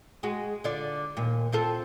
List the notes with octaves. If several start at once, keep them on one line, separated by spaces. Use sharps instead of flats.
G#3 F#4
D3 F4 D5
D#2 A#2
C4 F4 A4